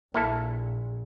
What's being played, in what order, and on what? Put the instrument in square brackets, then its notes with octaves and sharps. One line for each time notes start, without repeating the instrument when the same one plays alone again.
[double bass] A#1 [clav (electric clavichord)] A#3 E4 A4